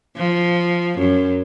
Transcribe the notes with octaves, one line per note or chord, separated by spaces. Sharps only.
F3
F#2